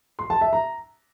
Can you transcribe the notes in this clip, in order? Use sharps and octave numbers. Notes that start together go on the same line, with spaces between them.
C6
A5
E5
A#5